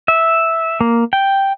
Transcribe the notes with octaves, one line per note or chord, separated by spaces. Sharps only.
E5
A#3
G5